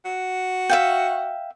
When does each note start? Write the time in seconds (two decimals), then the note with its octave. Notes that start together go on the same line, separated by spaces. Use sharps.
0.05 F#4
0.69 E5 F5 G5